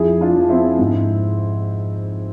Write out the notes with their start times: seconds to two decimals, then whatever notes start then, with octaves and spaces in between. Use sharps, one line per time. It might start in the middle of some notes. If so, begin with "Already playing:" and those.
Already playing: F2 E4 G#4
0.21 D4 F4
0.35 F3
0.50 C4 E4
0.79 G#2